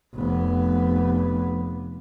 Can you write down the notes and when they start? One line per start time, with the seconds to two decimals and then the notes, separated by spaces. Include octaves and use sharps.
0.15 F1 B3